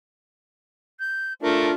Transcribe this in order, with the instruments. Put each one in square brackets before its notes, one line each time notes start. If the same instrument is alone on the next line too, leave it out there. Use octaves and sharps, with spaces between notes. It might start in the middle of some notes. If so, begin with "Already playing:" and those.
[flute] G6
[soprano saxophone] A3 [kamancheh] D4 [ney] F4 [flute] A#4